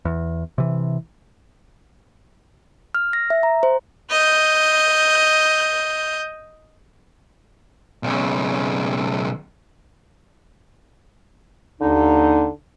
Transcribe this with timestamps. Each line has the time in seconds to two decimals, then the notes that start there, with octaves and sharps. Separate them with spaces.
0.05 E2
0.58 C3 E3
2.95 F6
3.13 A#6
3.30 E5
3.43 A#5
3.63 C5
4.11 D#5 G6
8.03 B1 C#3
11.81 D#2 D3 D#4